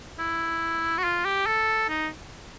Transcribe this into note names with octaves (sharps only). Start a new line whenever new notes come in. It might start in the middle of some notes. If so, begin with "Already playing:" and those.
E4
F#4
F4
G4
A4
D#4